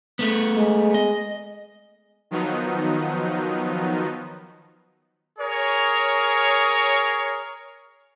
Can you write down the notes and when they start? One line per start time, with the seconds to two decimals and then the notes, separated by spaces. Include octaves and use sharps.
0.19 A3 B3
0.56 G#3
0.94 D#5
2.31 D#3 F3 F#3 B3 D#4
5.39 G#4 A#4 C#5